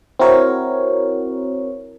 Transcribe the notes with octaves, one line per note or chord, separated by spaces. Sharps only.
C4 E4 F#4 A#4 C#5